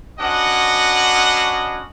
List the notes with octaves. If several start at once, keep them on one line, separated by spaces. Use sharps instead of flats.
C#4 D4 F#4 B4 D#5 F#5